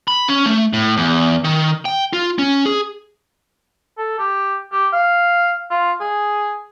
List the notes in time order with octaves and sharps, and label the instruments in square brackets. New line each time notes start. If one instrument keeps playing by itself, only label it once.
[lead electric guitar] B5
C#4
A3
A2
E2
D#3
G5
F4
C#4
G#4
[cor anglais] A4
G4
G4
F5
F4
G#4